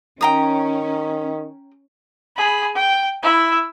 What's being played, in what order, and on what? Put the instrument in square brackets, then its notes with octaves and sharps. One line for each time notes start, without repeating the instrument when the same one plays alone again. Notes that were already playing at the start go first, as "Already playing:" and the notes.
[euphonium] D#3 [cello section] C#4 [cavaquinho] G5 A#5 D#6
[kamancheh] G#4 B5
G5
E4 E5